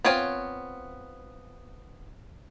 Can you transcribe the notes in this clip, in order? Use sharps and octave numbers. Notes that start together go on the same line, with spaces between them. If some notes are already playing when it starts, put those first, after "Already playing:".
B3 C4 F4 C#5 G#5